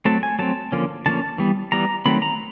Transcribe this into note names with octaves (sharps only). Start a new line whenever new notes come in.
F#3 A3 C4 A5
G#5
F#3 A3 C4 A5
D3 F3 A#3 C#4
D3 F3 A#3 C#4 A5
E3 G3 B3
E3 G3 B3 A#5
D#3 F#3 A3 C4 B5
A#5